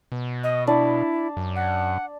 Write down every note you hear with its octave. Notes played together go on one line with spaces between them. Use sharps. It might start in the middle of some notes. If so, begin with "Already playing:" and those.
B2
D#5
D4 E4
F#2
F#5